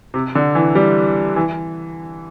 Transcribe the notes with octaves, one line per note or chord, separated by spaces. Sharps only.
C3
D3
E3
G3
E3